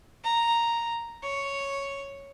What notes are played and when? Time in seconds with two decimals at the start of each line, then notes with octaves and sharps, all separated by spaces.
0.24 A#5
1.23 C#5